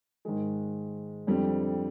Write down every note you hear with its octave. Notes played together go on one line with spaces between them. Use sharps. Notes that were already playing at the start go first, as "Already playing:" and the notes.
G#2 D#3 G#3
F2 D3 G3 C4